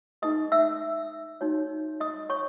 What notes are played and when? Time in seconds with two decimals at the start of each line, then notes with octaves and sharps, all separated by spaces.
0.22 D#4 G#4 B4 D#5 D#6
0.52 E5 E6
1.41 D#4 F#4 C#5
2.00 D#5 D#6
2.29 C#5 C#6